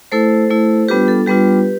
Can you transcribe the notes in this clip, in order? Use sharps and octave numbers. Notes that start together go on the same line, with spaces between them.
A3 E4 A4 C5
A3 E4
G3 B3 D4 F4 G4 B4
A4
G3 B3 D4 F4 G4 B4